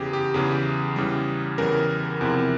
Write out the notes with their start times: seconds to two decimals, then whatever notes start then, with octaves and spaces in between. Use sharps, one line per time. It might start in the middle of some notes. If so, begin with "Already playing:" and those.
Already playing: E2 C#3 E3 G4 G#4
0.13 G4
0.34 E2 C#3 E3 G#4
0.96 E2 C#3 E3 G3
1.58 E2 C#3 E3 G3 A#4
2.21 E2 C3 F3 C4 E4